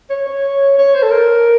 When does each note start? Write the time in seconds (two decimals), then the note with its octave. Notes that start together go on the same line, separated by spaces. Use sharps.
0.10 C#5
0.26 C#5
0.78 C#5
0.94 C5
1.03 A4
1.11 A#4